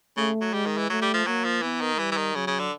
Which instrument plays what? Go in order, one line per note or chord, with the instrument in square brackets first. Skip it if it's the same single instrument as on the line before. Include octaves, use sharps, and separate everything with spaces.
[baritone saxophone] C#3 [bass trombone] A3
[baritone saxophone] F#3
[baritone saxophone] G3 [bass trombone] G#3
[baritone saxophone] D#3
E3
[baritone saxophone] F#3 [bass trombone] A3
[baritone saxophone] G3
F3
[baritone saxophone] F#3 [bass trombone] A#3
[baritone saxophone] F3
[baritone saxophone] E3 [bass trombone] B3
[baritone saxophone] D#3
[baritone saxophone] E3 [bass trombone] G3
[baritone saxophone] E3
D#3
[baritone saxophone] C#3 [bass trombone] F#3
[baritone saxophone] C#3
D3